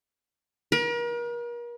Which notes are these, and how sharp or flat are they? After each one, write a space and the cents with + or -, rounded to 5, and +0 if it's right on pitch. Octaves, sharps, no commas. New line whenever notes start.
A#4 +40